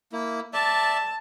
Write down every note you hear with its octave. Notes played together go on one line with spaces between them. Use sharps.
A#3 E4
D5 E5 A5